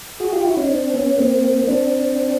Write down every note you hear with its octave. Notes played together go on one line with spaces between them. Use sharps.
F#4 G#4
F4 G4
E4 F#4
C#4 D#4
C4 D4
B3 C#4
A#3 C4
C4 D4